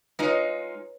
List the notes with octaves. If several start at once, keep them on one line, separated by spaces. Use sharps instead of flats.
G#3 D#4 F4 B4 C#5